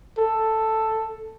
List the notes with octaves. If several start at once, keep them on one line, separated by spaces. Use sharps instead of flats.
A4